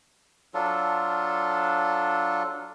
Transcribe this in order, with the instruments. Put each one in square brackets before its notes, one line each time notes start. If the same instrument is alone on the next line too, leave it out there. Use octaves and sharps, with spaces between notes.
[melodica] F#3 D4 F4 A4